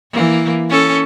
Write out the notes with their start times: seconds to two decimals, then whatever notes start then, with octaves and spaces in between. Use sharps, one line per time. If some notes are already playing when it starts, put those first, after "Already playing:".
0.12 E3 A#3
0.69 C#4 A4